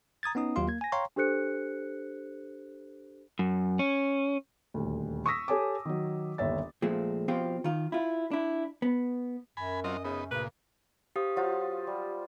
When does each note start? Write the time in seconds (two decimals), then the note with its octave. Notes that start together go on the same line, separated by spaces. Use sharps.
0.23 A#5 D#6 G#6 A6
0.35 B3 C#4 D#4 D#6
0.56 D#2 F#3 F4 G4 F5 C6
0.67 A#3 G#6
0.81 G#5 A#6
0.92 C#5 F5 G5 A#5 C6 C#6
1.16 D4 G4 A4 C5 F#6 C#7
3.39 F#2
3.79 C#4
4.74 D#1 D2
5.26 C#6 D#6 E6 A#6 B6
5.48 G4 A4 C#5 G#5 A5 D6
5.85 D#3 F#3
6.38 G1 D#2 C#5 E5 A6
6.82 A#2 F3 G#3 A3 C4
7.28 B2 F3 C4 F4 G4
7.64 D#3 F4
7.92 E4 F4
8.31 D4 E4
8.82 B3
9.57 F#2 G#5 B5
9.84 F#3 C4 F4 D#5
10.04 C#3 B3 D#4
10.31 D2 G2 A#2 C#3 B4
11.16 G4 C5 F5 D#6
11.36 F#3 F4 C5
11.87 G3